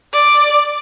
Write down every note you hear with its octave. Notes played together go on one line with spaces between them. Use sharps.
D5